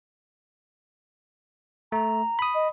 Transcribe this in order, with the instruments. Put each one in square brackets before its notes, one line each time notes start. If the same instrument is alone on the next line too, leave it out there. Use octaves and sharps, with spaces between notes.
[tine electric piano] A3 [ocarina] A#5
[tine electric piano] B5 D#6
[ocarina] D#5